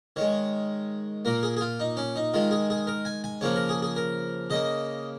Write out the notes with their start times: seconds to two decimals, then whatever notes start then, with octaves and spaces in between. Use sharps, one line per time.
0.16 D#3 G#3 C#5
1.25 A#2 A#3 A#4
1.43 G#4
1.57 G#4
1.61 F4
1.80 D#4
1.97 C#4
2.16 D#4
2.34 D#3 G#3 F4
2.51 G#4
2.70 G#4
2.87 A#4
3.05 G#5
3.24 G#5
3.41 C#3 F3 A#3 C#5
3.56 A#4
3.69 G#4
3.82 G#4
3.96 A#4
4.50 C#3 A#3 D#5